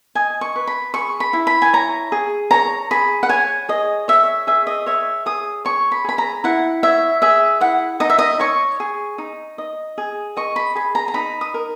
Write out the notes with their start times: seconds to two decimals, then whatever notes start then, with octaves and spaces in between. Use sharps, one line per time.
0.15 D#5 G#5
0.41 C#6
0.56 B4
0.67 B5
0.94 G#4 C#6
1.20 B5
1.33 E4
1.47 B5
1.62 G#5
1.73 C#5 A#5
2.12 G#4
2.51 C#5 A#5
2.91 G#4 B5
3.23 F#5
3.29 C#5 G#5
3.69 G#4 D#5
4.08 C#5 E5
4.47 G#4 E5
4.67 D#5
4.86 C#5 E5
5.26 G#4 D#6
5.65 C#5 C#6
5.92 B5
6.04 G#4 B5
6.18 A#5
6.44 E4 F#5
6.83 C#5 E5
7.22 G#4 E5
7.61 E4 F#5
8.00 D#4 D#5
8.10 E5
8.19 D#5
8.40 C#5 C#6
8.80 G#4
9.18 D#4
9.58 D#5
9.98 G#4
10.37 D#5 C#6
10.56 B5
10.75 G#4 B5
10.95 A#5
11.08 A#5
11.14 D#4 B5
11.41 D#6
11.54 A#4